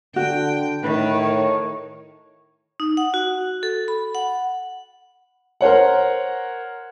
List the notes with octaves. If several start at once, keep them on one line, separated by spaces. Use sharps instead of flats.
D3 F#4 G5
A2 D#3 B4
C#5
D#4
F#5
F#4
A4
B5
F#5
A#4 C5 C#5 F#5